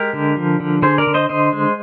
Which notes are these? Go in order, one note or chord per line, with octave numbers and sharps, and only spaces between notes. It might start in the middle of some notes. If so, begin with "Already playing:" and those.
Already playing: G#3 G4 A#4
D3
F3
D3
D3 G#4 C5
A#4 D5
D3
C5 D#5
D3 C5 D#5
G#3